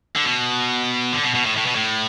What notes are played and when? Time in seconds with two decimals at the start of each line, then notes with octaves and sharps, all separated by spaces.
0.16 D3
0.25 B2
1.13 D3
1.24 B2
1.35 B2
1.46 A2
1.57 A2
1.67 B2
1.76 A2